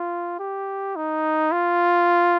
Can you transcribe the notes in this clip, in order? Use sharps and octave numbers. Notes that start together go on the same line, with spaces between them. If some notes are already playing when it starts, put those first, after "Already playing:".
Already playing: F4
G4
D#4
F4